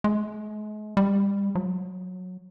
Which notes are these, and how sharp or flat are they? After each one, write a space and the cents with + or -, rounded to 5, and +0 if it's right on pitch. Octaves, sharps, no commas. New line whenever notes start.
G#3 +40
G3 +30
F#3 -15